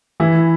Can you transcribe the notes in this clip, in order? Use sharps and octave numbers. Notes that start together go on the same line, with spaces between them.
E3 E4